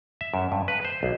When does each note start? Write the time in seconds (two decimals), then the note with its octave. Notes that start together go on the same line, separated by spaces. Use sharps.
0.21 E5
0.34 F#2
0.52 G2
0.68 B4
0.85 C5
1.03 B1